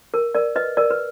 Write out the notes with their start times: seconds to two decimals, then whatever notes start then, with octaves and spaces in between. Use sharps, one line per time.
0.14 A#4
0.35 A#4 D5
0.56 B4 D#5
0.77 A#4 D5
0.90 B4